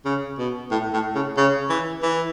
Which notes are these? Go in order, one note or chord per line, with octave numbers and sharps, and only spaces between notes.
C#3
B2
A2
A2
C#3
C#3
E3
E3